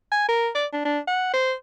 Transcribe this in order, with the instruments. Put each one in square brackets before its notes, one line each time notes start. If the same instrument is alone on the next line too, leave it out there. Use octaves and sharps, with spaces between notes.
[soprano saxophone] G#5
A#4
D5
D4
D4
F#5
C5